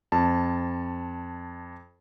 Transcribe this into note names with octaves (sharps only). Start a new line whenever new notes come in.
F2 A5